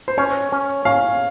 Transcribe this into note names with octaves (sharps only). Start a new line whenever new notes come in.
C5
C#4 C#5
C#4
C#4 F5